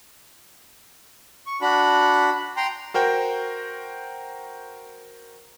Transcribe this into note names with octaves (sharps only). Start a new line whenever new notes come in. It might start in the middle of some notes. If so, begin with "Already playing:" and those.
C#6
D4 F#4 B5
G5 A#5 C6
F#4 A#4 C5 G5